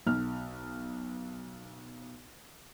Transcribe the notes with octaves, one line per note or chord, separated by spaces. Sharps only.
B1 F6